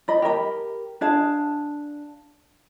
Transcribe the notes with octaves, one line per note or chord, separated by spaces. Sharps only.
D5 D#5 B5
G4 A#4 G#5 B5
D4 G#4 F5 A5